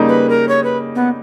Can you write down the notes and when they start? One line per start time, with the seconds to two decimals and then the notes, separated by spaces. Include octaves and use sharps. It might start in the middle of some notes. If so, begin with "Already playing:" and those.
Already playing: C#3 G3 A#3 D#4
0.09 B4
0.30 A#4
0.49 C#5
0.64 B4
0.95 B3